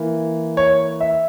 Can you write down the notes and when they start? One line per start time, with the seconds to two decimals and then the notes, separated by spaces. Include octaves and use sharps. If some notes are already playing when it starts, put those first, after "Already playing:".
Already playing: E3 A#3
0.57 C#5
1.01 E5